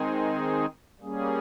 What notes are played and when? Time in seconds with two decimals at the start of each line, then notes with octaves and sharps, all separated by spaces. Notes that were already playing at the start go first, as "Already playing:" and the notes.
Already playing: D#3 G#3 C4 D#4 G#4
1.01 G3 A#3 C#4 G#4